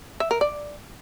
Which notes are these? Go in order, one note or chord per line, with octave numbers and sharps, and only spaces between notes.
E5
A#4
D5